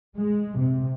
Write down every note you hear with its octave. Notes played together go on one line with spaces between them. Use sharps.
G#3
C3